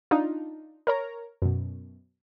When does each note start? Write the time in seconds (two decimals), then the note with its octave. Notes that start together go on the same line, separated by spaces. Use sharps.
0.11 D4 D#4 F4
0.87 A#4 C#5 A#5
1.42 F#2 B2